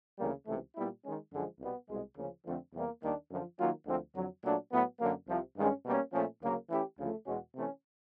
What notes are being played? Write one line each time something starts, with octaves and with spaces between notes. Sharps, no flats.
D2 C#3 E3 G3 A#3
C#2 C3 E3 A3
A#2 G3 B3 E4
D#3 G#3 C#4
F#2 D3 F3 G#3
C2 B2 G3 B3
C2 B2 G#3
D2 C#3 F3 A#3 C#4
F2 D3 F3 A3 C4
E2 C3 E3 G3 A#3
D#2 D#3 G3 A#3 D4
F#2 D3 F3
D#3 F#3 A#3 C#4 F4
D2 D3 F3 G#3 C4
F2 D3 F#3
A#2 F#3 A3 D4
A2 F#3 B3
F#2 D3 F#3 A#3
C2 C3 F3
G2 D#3 G#3 C#4
B2 G3 A#3 C#4
A#2 F3 A3 C#4
D2 C#3 F#3 A#3
E3 A3 C#4 E4 G4
D2 C#3 F3 A3
E2 B2 G#3 C#4 F#4
C3 E3 A3 C#4